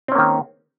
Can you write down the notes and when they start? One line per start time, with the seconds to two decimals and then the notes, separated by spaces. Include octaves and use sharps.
0.08 C4
0.12 C#4
0.15 A#3
0.19 D#3